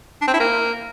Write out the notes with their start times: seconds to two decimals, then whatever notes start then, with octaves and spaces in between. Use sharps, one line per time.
0.21 D4
0.27 C4
0.34 E4
0.40 A#3